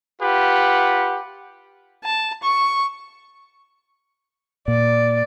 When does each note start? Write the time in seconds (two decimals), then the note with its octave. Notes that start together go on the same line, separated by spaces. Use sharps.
0.21 F4 G4 B4 F#5
2.05 A5
2.43 C#6
4.68 A#2 D5